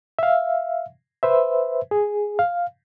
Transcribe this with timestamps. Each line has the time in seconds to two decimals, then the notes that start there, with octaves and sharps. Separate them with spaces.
0.19 E5 F5
1.23 B4 C5 E5
1.91 G#4
2.39 F5